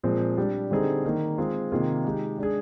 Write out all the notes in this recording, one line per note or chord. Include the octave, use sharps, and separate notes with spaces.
A#2 F3 G#3 C4
G3 D4 G4
D3 G3 C4 D#4 G#4
D#3 A#3 D#4
G#3 C4 F4 G#4
C3 D#3 A#3 F4 G#4
G#3 D#4 G4
G#3 D4 G#4